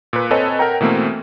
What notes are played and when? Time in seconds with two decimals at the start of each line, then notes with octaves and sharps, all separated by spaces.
0.13 A#2 B4
0.31 C4 A4 B4 C#5 D#5 G#5
0.59 A#4 F#5 G5 A#5
0.81 B2 E3 A3 A#3 C4